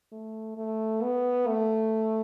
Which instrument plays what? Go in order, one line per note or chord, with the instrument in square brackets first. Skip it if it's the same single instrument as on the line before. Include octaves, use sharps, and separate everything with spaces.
[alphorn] A3
A3
B3
A3